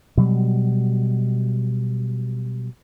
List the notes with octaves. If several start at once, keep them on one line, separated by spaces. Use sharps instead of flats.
B2 F#3 G3